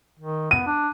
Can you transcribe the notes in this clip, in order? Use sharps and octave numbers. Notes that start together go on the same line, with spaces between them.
D#3
B3 D#7
D4